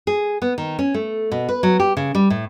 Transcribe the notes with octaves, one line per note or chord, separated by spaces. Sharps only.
G#4
B3
D#3
C#4
A3
B2
B4
F#3
G4
C#3
G3
A2